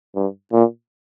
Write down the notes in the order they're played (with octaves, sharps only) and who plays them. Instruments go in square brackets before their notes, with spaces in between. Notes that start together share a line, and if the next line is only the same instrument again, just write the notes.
[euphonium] G2
A#2